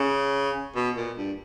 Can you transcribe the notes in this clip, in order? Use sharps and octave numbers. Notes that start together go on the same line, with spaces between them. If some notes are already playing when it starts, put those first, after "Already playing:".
Already playing: C#3
B2
A#2
G2